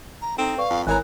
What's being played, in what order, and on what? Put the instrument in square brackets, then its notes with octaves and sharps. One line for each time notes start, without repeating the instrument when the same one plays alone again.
[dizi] A#5
[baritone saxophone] C4 [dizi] D#4 [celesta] A4
[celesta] B4 D5 C#6 [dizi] F5
[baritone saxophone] F2
[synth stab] G#1 C#5 A#5 [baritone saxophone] E3 [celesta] A#4 F#6 [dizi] G#5